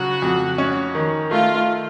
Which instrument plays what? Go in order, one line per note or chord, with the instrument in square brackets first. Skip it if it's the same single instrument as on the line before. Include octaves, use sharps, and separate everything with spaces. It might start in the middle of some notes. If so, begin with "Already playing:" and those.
Already playing: [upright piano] C#3 F#3 [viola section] F#4
[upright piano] F2
C#4
D#3
[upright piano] A3 [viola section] F4